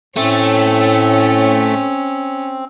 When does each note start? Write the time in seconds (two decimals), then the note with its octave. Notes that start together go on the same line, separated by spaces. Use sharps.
0.17 A2 A3 C4 C#4